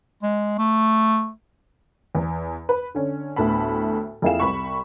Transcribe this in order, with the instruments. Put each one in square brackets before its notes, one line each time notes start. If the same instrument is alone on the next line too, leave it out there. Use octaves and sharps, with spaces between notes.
[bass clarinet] G#3
A3
[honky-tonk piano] E2
B4
D3 C#4
D2 A2 B3 A5 B5
F2 A#3 E4 G#4 F5 E7
C2 B5 C#6